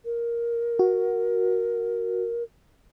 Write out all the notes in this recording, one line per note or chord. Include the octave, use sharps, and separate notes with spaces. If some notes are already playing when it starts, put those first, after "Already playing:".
A#4
F#4